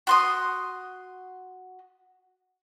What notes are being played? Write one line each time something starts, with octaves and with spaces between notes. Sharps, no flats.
F#4 C6 D#6